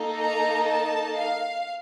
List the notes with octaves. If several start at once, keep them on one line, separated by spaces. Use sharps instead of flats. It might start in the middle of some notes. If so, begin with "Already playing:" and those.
Already playing: A#3 D#4 A4
A#5
A5
F5